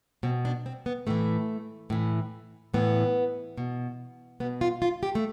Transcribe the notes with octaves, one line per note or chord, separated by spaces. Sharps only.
B2 C4
D4
C4
B3
A2 E3 A3
A2 E3
A2 E3 B3
B2
B2 B3
F4
F4
G4
A3